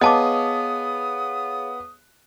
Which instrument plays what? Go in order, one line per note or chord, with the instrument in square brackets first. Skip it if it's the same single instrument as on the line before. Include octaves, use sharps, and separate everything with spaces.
[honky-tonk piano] B3 [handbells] G#4 C#5 F5 [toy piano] D#5 A5 D6 [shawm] D#6